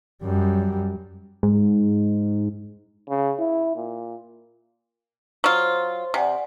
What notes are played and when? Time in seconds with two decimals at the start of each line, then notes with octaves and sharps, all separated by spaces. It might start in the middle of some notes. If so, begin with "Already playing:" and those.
0.22 F#2 G3
1.43 G#2
3.09 C#3
3.39 E4
3.76 A#2
5.44 F#3 F4 C5
6.14 C3 D5 F#5 G#5